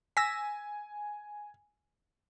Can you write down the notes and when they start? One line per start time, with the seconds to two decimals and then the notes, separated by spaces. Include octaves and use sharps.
0.17 G#5 E6 A#6 B6